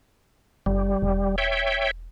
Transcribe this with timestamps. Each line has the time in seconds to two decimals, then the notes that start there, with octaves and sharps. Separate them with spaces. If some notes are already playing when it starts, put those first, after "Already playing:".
0.66 F#1 G3
1.02 E1
1.38 C#5 E5 G5